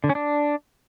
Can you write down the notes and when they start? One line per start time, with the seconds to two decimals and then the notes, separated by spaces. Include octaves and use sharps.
0.04 D3
0.09 C#4
0.15 D4